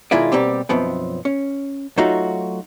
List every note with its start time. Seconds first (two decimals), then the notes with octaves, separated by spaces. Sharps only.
0.11 B2 D#3 G#3 E4 F4 D5
0.32 B2 G3 A#3 C4 G4
0.69 B1 F#2 F3 B3 C4
1.25 C#4
1.98 F#3 A3 D#4 F4 F#4